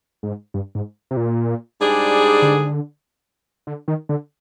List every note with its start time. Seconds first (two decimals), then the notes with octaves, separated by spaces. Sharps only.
0.23 G#2
0.54 G2
0.75 G#2
1.11 C3
1.17 A#2
1.79 G#2 G3 D4 G#4
2.42 D3
3.67 D3
3.88 D#3
4.09 D3